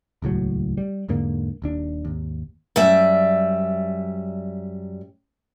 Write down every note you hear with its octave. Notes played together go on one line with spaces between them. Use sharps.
D#1 C#2 A2 F#3
G3
E2 G#2 D3 A#3
D#1 D#2 D4
G#1 D#2
F#2 G3 D5 E5